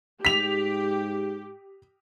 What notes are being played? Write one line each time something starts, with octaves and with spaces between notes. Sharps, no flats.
G#2 G4 B6 F7